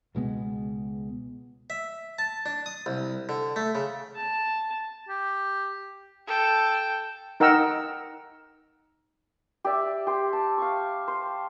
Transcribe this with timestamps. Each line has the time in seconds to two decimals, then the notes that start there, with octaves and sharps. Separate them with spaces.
0.15 C#2 B2 G#3 B3
1.70 E5
2.19 A5
2.46 D4
2.66 D#6
2.86 C2
3.29 D3
3.56 A3
3.75 C#3
4.16 A5
5.09 G4
6.27 A4 G5
7.40 D#4 A#4 F#5 G5 E6
9.64 G4 D5 E5
10.07 G4 C5
10.33 A5
10.58 F5 C#6
11.08 C5